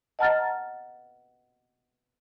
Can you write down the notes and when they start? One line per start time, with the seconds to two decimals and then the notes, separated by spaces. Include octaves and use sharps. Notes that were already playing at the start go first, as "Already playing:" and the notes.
0.19 D#5 F#5 A5 A#5 F6 A6